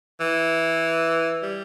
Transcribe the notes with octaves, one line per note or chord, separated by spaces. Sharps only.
E3
G3